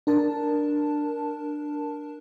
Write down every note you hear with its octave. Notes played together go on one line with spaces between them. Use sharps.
D4 A#4 A5